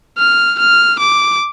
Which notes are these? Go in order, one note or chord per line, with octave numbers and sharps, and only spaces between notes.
F6
F6
D6